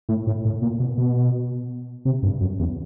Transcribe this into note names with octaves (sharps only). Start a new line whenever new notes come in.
A2
A2
A2
A#2
B2
B2
C3
G2
F#2
E2